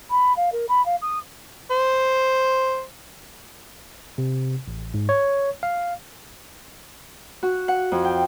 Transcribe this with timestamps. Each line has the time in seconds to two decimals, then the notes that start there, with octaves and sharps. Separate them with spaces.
0.10 B5
0.37 F5
0.52 A#4
0.69 B5
0.86 F5
1.02 D#6
1.71 C5
4.18 C3
4.68 A1
4.94 G#2
5.09 C#5
5.63 F5
7.43 F#4
7.68 F#5
7.92 F2
8.05 G5